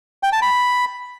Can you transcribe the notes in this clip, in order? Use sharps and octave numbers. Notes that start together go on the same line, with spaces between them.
G5
A5
B5